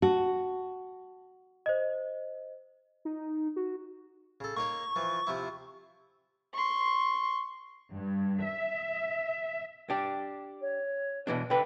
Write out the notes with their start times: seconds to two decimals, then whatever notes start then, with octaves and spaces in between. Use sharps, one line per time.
0.02 F#4 A5
1.66 C5 D#5
3.05 D#4
3.56 F#4
4.40 C#3 A4
4.57 A#3 D#4 C#5 C#6
4.96 E3 F3
5.27 C3 F3 E4
6.54 C6 C#6
7.94 G2
8.44 E5
9.90 D4 G4
10.61 C#5
11.27 B2 E3 D4
11.50 D3 B4 G5